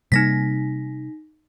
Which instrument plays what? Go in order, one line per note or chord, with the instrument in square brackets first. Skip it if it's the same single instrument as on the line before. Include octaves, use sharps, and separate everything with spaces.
[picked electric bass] C3 G3 A#3 [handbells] D#4 A#6 B6